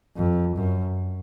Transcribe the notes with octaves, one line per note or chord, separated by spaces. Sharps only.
F2
F#2